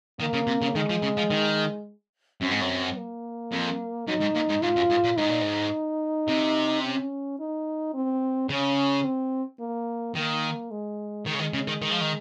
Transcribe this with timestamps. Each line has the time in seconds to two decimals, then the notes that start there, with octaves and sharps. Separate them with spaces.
0.20 D#3 A#3
0.33 C#3
0.47 C3
0.62 C#3
0.75 D#3 G#3
0.90 F3
1.02 C#3
1.17 F3
1.31 D#3
2.41 F#2 C4
2.51 G#2
2.61 F#2
2.97 A#3
3.52 F2
4.07 F#2 D#4
4.20 G#2
4.35 A#2
4.49 G#2
4.62 G#2 F4
4.76 F#2
4.90 G#2
5.04 A#2
5.17 G#2 D#4
5.29 A#2
5.41 G#2
6.28 C3
6.84 C#4
7.39 D#4
7.94 C4
8.49 C#3 C#4
9.04 C4
9.60 A#3
10.15 D#3 A#3
10.71 G#3
11.26 D#3 G#3
11.34 C#3
11.39 D#3
11.54 C#3
11.67 D#3
11.82 D#3
11.91 F3
12.01 D#3